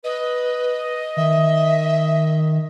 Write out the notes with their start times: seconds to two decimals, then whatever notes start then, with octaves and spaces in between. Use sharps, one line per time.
0.04 B4 D#5
1.17 D#3 E5